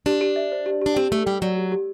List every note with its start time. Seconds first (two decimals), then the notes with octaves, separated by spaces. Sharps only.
0.06 D4 G4
0.21 G4
0.36 E5
0.52 C5
0.66 G4
0.82 D4 G4
0.96 C4 G4
1.12 A3 G4
1.26 G3 G5
1.42 F#3 D5
1.57 G4
1.72 G4